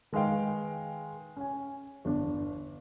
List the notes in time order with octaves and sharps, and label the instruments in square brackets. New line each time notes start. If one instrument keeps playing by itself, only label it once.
[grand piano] D#3 G#3 B4 F5 G5
C#4 G#5
G1 E2 D4